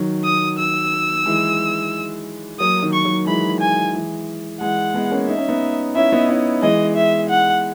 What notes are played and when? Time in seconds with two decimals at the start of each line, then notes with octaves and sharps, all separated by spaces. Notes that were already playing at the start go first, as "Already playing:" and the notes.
Already playing: D#3 F#3
0.25 D#6
0.58 E6
1.26 E3 G#3
2.60 F#3 A#3 D#6
2.82 D#3 F#3
2.93 C#6
3.05 D#3 F#3
3.27 E3 G#3 B5
3.60 G#5
3.94 E3 G#3
4.61 E3 G#3 F#5
4.94 G#3 B3
5.11 A#3 C#4
5.28 D#4 E5
5.38 C#4
5.48 B3 D#4
5.95 C#4 E4 E5
6.12 B3 D#4
6.29 C#4 E4
6.62 E3 G#3 D#5
6.96 E5
7.29 F#5